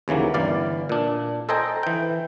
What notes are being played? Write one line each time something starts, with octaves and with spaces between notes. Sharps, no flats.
D#2 C#3 E3 F#3 A#3
G1 E3 D5 F5
A#2 D4
A4 C5 D#5 G5 G#5 A#5
E3 G5